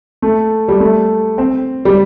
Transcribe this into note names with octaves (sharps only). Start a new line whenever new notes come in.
A3
G3
A3
C4
G3